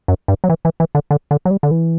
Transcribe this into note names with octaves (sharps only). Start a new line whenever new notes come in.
F#2
G2
F#3
E3
E3
E3
D3
D3
D3
F#3
G3
D3
E3